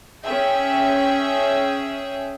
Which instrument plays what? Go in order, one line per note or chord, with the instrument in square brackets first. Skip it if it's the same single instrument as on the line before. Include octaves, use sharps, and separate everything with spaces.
[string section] C#4 G#4 E5 G5